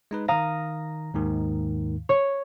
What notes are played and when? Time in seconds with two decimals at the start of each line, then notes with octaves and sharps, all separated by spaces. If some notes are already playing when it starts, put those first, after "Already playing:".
0.11 G#3 D#4 B4
0.28 D#3 F5 A#5 D#6 A#6
1.14 D#2 G#2 D#3
2.09 C#5